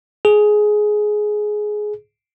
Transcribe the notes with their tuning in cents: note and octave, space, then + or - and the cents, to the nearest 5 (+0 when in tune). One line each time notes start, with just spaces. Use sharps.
G#4 +15